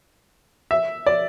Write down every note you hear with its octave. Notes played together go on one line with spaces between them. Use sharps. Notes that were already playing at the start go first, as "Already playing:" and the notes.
E5
D5